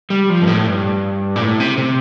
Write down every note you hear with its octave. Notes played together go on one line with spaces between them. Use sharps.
G3
F3
G2
A2
G2
A#2
A2
C3
C3